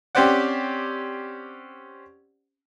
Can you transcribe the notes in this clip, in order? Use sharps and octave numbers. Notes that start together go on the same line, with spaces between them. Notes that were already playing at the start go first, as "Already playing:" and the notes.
C4 C#4 G4 C5 D5 F#5